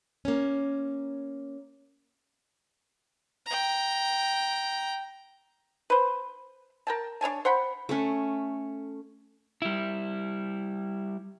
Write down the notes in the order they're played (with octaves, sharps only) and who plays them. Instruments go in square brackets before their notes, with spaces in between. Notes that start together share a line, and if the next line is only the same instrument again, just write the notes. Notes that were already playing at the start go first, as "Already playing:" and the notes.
[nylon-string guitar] A#3 C#4
[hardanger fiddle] G5 A#5
[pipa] B4 C5
A#4 G5 A5
D4 C#5 G#5 A5
C5 F#5 G5 B5
[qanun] A3 C#4
[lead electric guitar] G3 E4